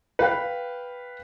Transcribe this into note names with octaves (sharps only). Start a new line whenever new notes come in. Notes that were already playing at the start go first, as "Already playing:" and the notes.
B4 F5 G5